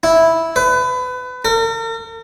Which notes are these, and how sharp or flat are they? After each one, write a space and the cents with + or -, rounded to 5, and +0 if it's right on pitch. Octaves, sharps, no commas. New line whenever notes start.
E4 -5
B4 +25
A#4 -40